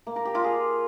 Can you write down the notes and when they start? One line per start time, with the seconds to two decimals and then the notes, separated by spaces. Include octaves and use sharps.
0.07 A#3
0.16 A#4
0.25 G4
0.35 F4
0.44 G#4